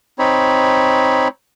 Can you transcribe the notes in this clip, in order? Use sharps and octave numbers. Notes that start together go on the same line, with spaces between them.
C4 D#4 C#5 B5